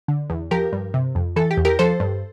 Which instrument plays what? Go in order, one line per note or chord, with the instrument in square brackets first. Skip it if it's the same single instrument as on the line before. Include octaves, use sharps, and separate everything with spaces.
[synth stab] D3
E2
F3 G4 A#4
G2
C3
F2
E3 A4
G4
E2
G4 A#4
F3 A4 C5
G2